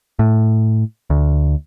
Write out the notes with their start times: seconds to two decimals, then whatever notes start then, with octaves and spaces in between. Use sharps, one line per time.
0.19 A2
1.10 D2